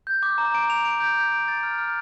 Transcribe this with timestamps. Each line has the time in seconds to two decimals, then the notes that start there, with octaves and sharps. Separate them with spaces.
0.07 G6
0.23 D6
0.38 A#5
0.55 D7
0.70 F7
0.85 D7
1.00 G6
1.17 G6
1.32 D7
1.48 A6
1.63 F6
1.78 F6